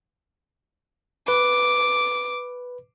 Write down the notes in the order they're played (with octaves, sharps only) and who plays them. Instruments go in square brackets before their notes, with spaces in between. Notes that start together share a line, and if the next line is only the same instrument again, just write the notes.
[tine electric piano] B4 [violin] D6